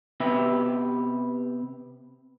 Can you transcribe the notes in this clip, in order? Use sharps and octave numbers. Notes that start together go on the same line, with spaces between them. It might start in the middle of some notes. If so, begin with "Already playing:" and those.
C3 B3 G4 B4 E5